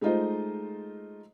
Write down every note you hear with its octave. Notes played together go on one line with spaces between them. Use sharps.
G#3 A3 D#4 F4 C5 D#5